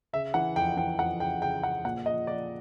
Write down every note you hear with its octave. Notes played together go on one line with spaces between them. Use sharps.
C#3 E5
E3 F#5
F2 G5
E3 G5
F2 F#5
C#3 G5
C#3 G5
C#3 F#5
A#2 F#5
F3 D#5
F3 D5